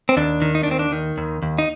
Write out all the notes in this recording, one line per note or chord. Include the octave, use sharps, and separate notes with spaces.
C4
D#2 D4
D#3
D#4
D4
D#2 C4
D4
D#3
D#2
D#2
D#4